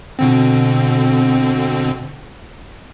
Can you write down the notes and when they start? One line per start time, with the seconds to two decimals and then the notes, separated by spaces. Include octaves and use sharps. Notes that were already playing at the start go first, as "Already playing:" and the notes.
0.19 B2 D3 C4